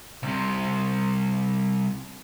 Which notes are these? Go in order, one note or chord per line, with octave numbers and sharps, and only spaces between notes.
C2 C3